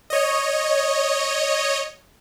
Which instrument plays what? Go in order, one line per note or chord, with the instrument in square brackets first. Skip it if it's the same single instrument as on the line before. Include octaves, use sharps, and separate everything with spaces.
[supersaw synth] C#5 D#5